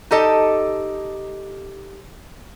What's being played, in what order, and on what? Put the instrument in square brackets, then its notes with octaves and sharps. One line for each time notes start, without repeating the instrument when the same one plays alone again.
[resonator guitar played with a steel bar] D#4 G4 A4 D#5